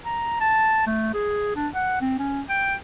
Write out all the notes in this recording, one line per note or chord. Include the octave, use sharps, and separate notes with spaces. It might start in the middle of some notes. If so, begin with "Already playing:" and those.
A#5
A5
A3
G#4
D4
F#5
C4
C#4
G5